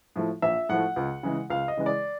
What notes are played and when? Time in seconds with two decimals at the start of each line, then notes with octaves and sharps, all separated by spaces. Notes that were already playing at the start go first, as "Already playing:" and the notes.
0.16 A2 F3 A3
0.42 A#1 E5
0.69 A2 F3 A3 F#5
0.96 C#2
1.23 C#3 E3 G#3
1.50 C#2 F5
1.68 D#5
1.77 C#3 E3 G#3
1.86 D5